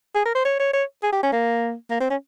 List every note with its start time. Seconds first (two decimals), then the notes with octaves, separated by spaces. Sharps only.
0.15 G#4
0.25 A#4
0.35 C5
0.45 C#5
0.60 C#5
0.73 C#5
1.03 G#4
1.13 G4
1.23 C#4
1.33 A#3
1.90 A#3
2.00 C4
2.10 C#4